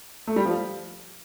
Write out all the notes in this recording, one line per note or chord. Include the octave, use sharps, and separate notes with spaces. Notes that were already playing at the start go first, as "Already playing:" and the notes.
A3
G3
F3